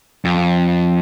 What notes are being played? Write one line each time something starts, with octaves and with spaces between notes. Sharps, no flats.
F2